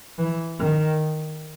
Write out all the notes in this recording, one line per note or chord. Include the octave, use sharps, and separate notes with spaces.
E3
D#3